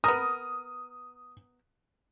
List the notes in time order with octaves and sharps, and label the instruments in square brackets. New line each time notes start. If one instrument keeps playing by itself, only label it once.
[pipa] B3 A#4 [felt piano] D#6